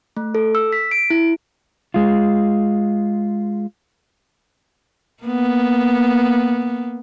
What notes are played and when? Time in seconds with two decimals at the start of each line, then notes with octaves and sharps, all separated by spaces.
0.17 A3
0.35 A4
0.55 E6
0.73 B6
0.91 D7
1.10 E4
1.94 G#3 F4
5.23 A#3 B3